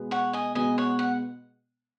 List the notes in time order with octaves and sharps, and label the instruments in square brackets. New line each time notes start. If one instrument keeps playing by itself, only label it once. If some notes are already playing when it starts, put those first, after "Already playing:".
Already playing: [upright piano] B2 G#3 B3
[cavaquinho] C#5 F#5
D#5 G#5
[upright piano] B2 G#3 B3 [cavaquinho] D#5 G#5
[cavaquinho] C#5 F#5
F#5